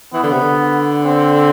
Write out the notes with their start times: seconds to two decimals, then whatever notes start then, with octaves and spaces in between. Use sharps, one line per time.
0.14 E3 B3
0.23 D3
0.32 C3
0.42 D3
1.05 C4